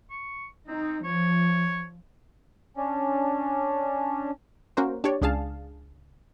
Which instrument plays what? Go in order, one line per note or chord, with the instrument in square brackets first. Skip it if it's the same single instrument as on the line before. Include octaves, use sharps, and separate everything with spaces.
[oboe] C#6
[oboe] C4 [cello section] D#4
[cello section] F3 [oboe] C#5
[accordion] C#4 D4
[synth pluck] A#3 C#4 F#4 A#4 C5
D4 G4 C#5 D5
C#2 D4 G#4 F5 A5